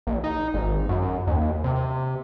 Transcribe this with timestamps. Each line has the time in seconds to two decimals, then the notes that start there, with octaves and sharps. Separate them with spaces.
0.07 A#1
0.24 D#4
0.54 G#1
0.89 F#2
1.27 D#2
1.64 C3